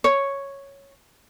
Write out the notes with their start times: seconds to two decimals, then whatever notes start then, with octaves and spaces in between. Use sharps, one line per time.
0.04 C#5